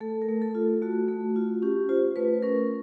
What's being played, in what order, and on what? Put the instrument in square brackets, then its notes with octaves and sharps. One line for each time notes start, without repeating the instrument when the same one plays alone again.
[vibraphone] A3 A4
A#4
A3
A4
F4
A3 F#4
A3
F4
C#4 G4
F4 C5
A3 B4
C#4 A#4